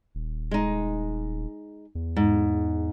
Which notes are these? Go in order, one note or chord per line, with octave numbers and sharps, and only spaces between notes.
D#1
G#3 D#4
E2
G#2